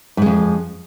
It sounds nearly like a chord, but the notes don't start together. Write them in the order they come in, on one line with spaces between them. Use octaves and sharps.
G#2 G#3 F2